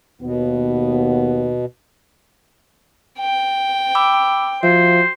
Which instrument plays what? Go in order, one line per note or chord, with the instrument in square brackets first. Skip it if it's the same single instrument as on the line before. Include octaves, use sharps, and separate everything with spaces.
[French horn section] D#2 B3 [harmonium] B2
[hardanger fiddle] G5
[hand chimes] B5 D6 E6
[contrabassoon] F3 [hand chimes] F#4 E5 [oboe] C5